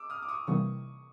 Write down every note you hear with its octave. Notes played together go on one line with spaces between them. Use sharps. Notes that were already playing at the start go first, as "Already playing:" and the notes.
Already playing: D6 E6
D#6 F6
D6
C#6 D#6
C3 E3 G3 A#3 C#6 D#6